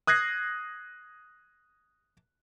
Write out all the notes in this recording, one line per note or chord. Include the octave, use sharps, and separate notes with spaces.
D#6 F#6 G#6 A#6 C7